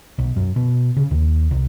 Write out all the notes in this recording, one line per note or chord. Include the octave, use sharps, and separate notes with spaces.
B1
F#2
B2
C#3
D#2
C2